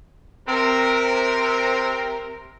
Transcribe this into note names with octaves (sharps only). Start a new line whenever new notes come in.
C3 C4 A#4